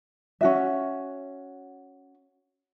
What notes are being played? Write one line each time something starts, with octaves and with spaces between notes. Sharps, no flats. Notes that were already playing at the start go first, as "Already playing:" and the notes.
C#4 F#4 E5